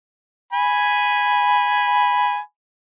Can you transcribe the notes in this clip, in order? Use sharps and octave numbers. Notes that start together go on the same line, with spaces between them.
G#5 B5